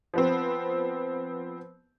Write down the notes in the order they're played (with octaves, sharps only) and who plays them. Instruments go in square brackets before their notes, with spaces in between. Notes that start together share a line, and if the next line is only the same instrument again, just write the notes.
[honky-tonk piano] F3 B3 C4